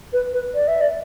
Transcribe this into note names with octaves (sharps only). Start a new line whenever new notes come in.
B4
B4
D5
E5
D5